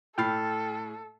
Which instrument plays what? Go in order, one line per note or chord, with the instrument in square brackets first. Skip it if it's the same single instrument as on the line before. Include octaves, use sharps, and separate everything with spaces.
[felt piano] A2 B5 C7 [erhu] A4 [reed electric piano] G5 F6 A6